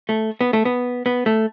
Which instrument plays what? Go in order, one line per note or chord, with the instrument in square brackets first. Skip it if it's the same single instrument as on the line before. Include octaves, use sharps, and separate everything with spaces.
[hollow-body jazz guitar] A3
B3
A3
B3
B3
A3